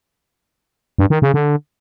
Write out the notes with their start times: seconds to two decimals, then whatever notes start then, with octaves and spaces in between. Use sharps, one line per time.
0.98 G2
1.10 D#3
1.22 C#3
1.34 D3